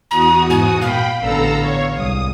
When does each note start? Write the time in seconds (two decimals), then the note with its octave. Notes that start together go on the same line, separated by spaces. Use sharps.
0.11 E2 F#4 A#5 D#6
0.50 G#2 G#5
0.82 A#2 F5 G5 B5
1.20 A1 D3 B3 A4 A#5 E6
1.61 C#5
1.95 C2 G#3 D#6